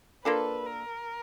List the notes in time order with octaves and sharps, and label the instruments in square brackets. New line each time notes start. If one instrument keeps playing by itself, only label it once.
[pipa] A#3 D4 F4 A4 [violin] B4
[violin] A#4